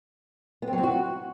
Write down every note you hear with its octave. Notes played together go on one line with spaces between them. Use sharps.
B3
C4
F#3
C4
F#4